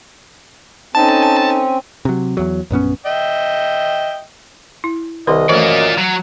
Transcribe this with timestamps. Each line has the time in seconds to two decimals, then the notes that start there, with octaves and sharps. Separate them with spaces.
0.95 C4 C#4 D#4 A4 A5
2.05 C3 F#3
2.37 E2 F#3
2.70 A#1 F#2 B3 C#4
3.06 D#5 E5 G5
4.84 E4
5.27 C2 D#3 B4 D#5 C6
5.49 F#2 E3 A3 F4 A4 D5
5.97 F#3